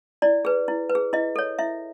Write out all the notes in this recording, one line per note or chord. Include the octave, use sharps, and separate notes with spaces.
E4 D5
G#4 B4
E4
B4
G#4
E4 D#5
A4 C#5
E4 E5